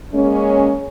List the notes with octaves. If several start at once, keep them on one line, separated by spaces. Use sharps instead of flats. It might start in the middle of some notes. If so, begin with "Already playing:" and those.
G#3 A#3 C#4